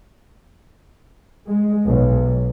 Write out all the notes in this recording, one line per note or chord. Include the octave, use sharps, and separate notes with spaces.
G#3
B1